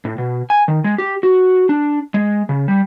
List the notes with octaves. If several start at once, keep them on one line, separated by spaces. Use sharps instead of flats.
A2
B2
G#5
D#3
G#3
G4
F#4
D4
G#3
C#3
G3